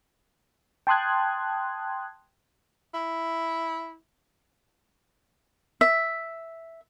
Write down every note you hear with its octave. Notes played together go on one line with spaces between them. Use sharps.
G5 A5 C6 D#6 F#6 G#6
E4
E5